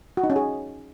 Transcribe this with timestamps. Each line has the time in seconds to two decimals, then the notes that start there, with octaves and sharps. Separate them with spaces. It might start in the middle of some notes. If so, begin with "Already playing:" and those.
0.17 F#4
0.24 D#4
0.30 C#4
0.36 G#4